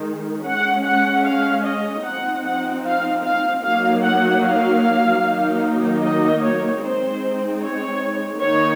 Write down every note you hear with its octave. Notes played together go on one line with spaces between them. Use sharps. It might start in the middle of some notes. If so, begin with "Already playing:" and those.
Already playing: D#3 G#3 D#4
G#3 C#4 F#5
F#5
F5
D#5
F3 C4 D#4 F#5
F#5
F5
F5
F#3 A#3 D#4 F5
F#5
F5
D#3 F#3 A#3 D#4
D#5
C#5
G#3 C4 D#4 C5
C#5
D#3 A#3 D#4 C#5